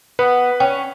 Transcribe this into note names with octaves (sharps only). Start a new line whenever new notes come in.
B3 B4
C#4 G5